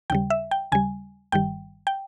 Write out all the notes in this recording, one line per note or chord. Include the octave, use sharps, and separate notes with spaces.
D#2 C#3 G3 G5
E5
G5
D#2 C#3 G3 G#5
G1 G2 D#3 G3 G5
G5